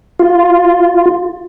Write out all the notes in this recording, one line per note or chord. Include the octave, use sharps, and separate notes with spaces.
F4